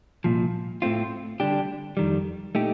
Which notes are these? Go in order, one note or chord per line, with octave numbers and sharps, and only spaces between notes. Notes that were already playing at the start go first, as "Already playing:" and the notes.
C2 A#2 F3
A2 A3 C4 F4
D3 G3 D4 G4
F2 D#3 G3
A#2 A3 D#4 G4